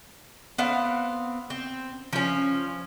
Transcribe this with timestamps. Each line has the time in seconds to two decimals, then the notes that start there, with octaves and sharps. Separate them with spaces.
0.58 B3 C4 F5 F#5
1.50 C4
2.13 F3 C#4